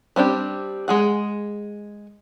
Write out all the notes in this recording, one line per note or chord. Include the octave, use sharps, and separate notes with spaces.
G3 C4 D4 G4
G#3 G#4 F#5